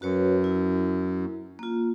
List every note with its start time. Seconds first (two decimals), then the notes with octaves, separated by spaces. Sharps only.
0.02 F#2 F#4 B4 C#5
0.44 E4
1.59 A#3 F4